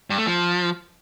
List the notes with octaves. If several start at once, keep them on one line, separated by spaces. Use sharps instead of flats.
G2
A3
F3